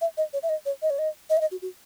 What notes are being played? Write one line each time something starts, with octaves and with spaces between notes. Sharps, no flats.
E5
D#5
C#5
E5
D#5
C#5
D#5
C#5
D#5
D#5
E5
D#5
F#4
F#4